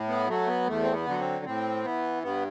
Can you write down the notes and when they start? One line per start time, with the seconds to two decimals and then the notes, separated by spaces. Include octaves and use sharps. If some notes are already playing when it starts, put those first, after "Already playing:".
Already playing: A2
0.08 B3
0.28 F#3 A3
0.48 B3
0.67 E2 A3
0.82 C4
0.93 B3
1.06 D3 F#3
1.19 C4
1.45 A2 C4
1.84 E3 B3
2.23 G2 B3